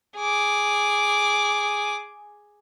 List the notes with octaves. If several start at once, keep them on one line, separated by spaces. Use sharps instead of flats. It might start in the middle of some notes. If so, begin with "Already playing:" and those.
G#4 D6